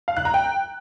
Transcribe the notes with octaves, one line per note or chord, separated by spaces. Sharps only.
F5
F#6
A#5
G5